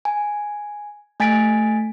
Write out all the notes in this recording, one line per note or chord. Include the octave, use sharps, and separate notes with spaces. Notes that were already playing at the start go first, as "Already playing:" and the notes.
G#5
A3 G#5 A6 B6 D7